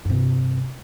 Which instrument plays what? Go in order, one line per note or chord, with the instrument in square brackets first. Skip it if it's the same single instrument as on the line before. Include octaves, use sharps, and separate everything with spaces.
[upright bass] G2 C3